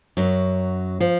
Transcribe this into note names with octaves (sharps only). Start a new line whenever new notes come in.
F#2 F#3
F3